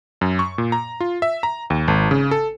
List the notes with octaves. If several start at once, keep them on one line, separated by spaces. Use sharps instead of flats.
F#2
C#6
A#2
A#5
F4
E5
A#5
D#2
G#1
C#3
A4